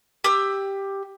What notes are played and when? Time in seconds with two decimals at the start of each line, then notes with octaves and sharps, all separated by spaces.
0.24 G4 E6